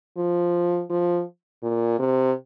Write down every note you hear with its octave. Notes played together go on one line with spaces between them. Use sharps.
F3
F3
A#2
C3